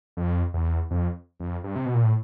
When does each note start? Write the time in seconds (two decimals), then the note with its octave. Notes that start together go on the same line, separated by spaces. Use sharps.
0.17 F2
0.54 E2
0.91 F2
1.40 F2
1.64 G2
1.76 C3
1.86 B2
1.94 A#2
2.03 A2